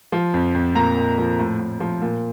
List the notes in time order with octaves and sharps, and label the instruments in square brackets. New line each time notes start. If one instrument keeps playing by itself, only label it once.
[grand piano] F3
F2
F2
A#2 A#5
A#2
F3
A2
A2
F3
A#2